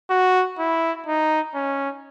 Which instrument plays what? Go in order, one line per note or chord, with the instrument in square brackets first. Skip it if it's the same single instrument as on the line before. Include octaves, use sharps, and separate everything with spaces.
[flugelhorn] F#4
E4
D#4
C#4